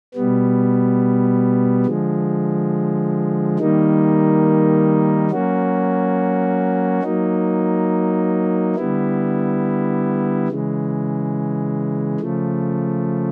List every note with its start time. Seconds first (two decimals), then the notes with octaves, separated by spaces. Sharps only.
0.14 B2 G3 B3
1.86 D3 F3 G#3
3.59 D#3 G3 A#3 D#4
5.31 F#3 A#3 C#4 F#4
7.03 F#3 A#3 D#4
8.76 D3 G3 B3 E4
10.48 C#3 E3 G#3
12.20 C#3 F3 A3